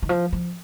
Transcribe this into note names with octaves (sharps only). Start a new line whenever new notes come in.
D#3
F3
F3